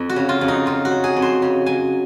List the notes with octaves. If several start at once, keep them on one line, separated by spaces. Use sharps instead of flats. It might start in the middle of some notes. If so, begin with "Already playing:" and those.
Already playing: F2
F#4
C#3
F4
F2
D#4
F#3 F4
F#4
F#3
G#4
F2
C5
C#3
F#3 G#5